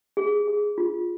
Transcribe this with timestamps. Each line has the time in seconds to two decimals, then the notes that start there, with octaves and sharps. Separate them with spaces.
0.17 G#4
0.47 G#4
0.78 F4